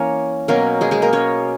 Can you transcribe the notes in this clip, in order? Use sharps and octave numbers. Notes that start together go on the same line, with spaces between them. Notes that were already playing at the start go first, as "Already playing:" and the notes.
Already playing: E3 A#3 C#4 A#4 C#5
B2 F#3 A#3 C#4 A#4
G#3 G#4
G#3 G#4
A#3 A#4
C#4 C#5